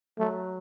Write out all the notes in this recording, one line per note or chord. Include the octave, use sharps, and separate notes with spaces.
F#3 A3